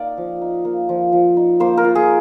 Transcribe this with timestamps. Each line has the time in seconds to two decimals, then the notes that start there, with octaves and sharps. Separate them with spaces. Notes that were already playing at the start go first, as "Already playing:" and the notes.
Already playing: A#3 D#4 D5 F5
0.17 F3
0.42 D#4
0.65 A#3
0.89 F3
1.12 F3
1.37 D#4
1.60 A#3 C5
1.77 A#4
1.84 F4
1.95 G#4